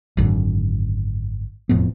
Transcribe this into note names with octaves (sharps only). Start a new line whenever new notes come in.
G#1 F#2 D3
E1 F2 A2 B3